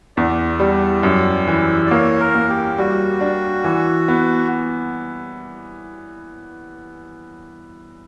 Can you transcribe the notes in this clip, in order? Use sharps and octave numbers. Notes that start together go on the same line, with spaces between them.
E2 D5
G3
F#2
E3
D5
A#3 C#5
A#4
A#3
G4
G3 F#4
D4
E3
B3